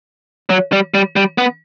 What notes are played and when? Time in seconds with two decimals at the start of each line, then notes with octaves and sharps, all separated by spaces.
0.50 F#3
0.72 G3
0.94 G3
1.16 G3
1.38 B3